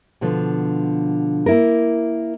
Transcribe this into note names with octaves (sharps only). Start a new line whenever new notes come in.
B2 D3 F3
A#3 E4 A#4